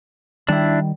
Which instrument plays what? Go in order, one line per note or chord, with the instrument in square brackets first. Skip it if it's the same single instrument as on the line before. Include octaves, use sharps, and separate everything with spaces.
[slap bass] D#3 G3 [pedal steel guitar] D4 E4